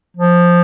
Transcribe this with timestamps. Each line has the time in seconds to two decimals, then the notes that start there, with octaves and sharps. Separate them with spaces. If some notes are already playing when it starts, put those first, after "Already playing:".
0.17 F3